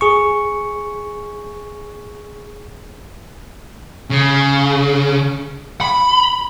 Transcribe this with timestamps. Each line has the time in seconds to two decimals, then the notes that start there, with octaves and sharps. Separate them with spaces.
0.01 G#4 C#6
4.10 C#3
5.81 B5